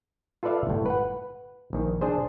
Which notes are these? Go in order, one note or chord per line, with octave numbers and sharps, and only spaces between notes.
F4 A4 B4 D5 E5 F5
G1 A2
B4 F#5
A#1 D#3
D4 G#4 C5